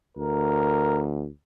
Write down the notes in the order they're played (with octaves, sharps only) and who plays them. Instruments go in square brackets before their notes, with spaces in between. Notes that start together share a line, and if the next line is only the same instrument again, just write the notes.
[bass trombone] D2 [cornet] A#4